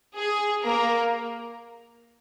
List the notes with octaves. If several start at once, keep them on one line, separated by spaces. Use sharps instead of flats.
G#4
A#3 A#4